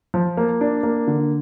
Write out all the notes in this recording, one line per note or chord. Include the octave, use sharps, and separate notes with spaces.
F3
A#3
D4
A#3
D3